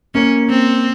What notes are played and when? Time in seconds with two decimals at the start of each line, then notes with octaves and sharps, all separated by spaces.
0.14 A#3 C#4
0.50 C4